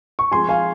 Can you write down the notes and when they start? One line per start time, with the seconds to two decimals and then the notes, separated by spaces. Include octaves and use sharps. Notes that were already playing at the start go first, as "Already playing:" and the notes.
0.19 C#6
0.32 F3 G#3 C4 G#5 C6
0.49 F5 G#5